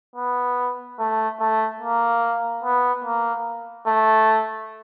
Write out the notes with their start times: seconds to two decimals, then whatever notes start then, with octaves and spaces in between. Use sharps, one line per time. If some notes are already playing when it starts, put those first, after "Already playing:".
0.16 B3
0.99 A3
1.40 A3
1.80 A#3
2.63 B3
3.04 A#3
3.87 A3